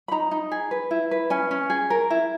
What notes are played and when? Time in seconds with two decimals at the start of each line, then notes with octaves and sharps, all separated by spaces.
0.08 B5
0.11 D#4 A#5
0.31 D#4
0.51 G#4
0.71 B4
0.91 E4
1.11 B4
1.30 C#4 G#5
1.51 C#4
1.70 G#4
1.90 A#4
2.10 E4